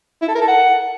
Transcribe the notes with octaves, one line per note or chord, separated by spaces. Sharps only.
E4
A4
A#4
A4
F#5